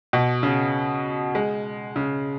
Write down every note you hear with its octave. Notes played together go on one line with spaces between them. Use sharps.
B2
C#3
G#3
C#3